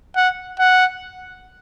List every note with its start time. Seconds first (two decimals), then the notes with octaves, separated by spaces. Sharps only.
0.16 F#5
0.59 F#5